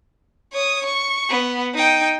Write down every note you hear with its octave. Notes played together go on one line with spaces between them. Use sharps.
C#5 D#6
C#6
B3
D#4 G5